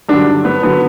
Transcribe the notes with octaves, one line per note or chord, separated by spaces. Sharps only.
G2 D3 F#3 D4
B3
D3 F#3 B3